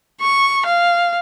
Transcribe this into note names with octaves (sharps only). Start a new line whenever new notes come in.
C#6
F5